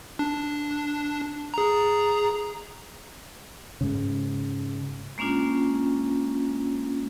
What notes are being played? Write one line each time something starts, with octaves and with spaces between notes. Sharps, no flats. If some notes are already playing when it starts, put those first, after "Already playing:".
D4
G#4 A#5
G#2 C#3
G#3 A#3 C#4 D4 F4